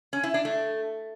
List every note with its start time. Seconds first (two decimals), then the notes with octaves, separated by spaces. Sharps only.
0.13 C#4
0.23 E4
0.34 D4
0.45 A3